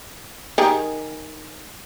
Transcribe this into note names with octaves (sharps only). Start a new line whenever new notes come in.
D#3 G4 G#4